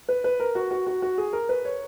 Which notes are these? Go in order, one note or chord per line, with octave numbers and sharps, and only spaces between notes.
B4
B4
A#4
F#4
F#4
F#4
F#4
G#4
A#4
B4
C#5